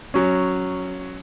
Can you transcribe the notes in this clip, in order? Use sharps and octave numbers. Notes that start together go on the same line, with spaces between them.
F#3 C#4